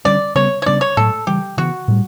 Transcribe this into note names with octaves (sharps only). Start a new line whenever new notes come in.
D3 G3 C#4 D5
C#3 G3 B3 C#5
C#5
C#3 G3 B3 D4 D5
C#5
A2 F#3 A3 A4
C#3 E3 G3 G4
C#3 E3 B3 F#4
A2 G3